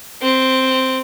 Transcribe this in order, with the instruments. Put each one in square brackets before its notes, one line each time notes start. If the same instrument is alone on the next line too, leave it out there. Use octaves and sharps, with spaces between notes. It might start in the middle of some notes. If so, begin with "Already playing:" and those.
[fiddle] C4